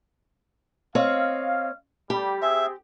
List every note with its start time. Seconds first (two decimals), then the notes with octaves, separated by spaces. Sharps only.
0.95 C4 C#5 D#5 F5
2.10 G3 G4
2.42 C4 G#4 E5